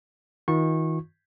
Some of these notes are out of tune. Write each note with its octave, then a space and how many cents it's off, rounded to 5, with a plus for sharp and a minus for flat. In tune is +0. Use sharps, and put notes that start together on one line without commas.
D#3 +40 F4 +40 C#6 -25